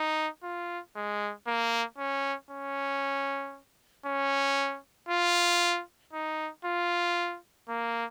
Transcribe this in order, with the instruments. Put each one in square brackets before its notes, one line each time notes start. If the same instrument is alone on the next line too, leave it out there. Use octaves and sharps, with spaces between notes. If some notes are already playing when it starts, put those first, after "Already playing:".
Already playing: [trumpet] D#4
F4
G#3
A#3
C#4
C#4
C#4
F4
D#4
F4
A#3